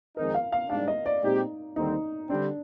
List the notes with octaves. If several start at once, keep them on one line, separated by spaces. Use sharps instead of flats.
F2 D#3 G#3 C4 D#4 A#4
F5
F5
G#2 G3 D4 F5
D#5
D5
A#2 G#3 C4 D#4 G4
D#2 D3 G3 C4 D#4
D3 G3 C4 D4